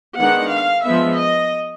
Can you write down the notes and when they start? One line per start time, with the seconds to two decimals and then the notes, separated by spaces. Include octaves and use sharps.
0.19 D#3 G#3 B3 D4 F#5
0.51 F5
0.85 F3 G#3 B3 E5
1.18 D#5